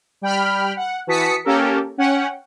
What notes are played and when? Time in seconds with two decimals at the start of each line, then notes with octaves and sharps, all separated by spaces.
0.22 G3 G5 B5 F6
0.76 F#5
1.07 E3 F#4 A5 D#6 B6 C#7
1.44 A#3 C#4 G4 A4 A#4
1.98 C#4 F#5 G5